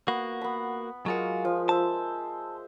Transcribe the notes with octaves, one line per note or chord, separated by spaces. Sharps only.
A#3 B3 F#4
B3 B5
F#3 G#3 F4 F#4 A#4 F5
F3
C5 E5 A5